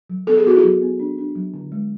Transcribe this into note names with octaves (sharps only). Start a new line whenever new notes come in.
F#3
B3 A4
G#4
B3 F#4
E4 G#4
F#3
B3
D4
D4
F#3
D3
G#3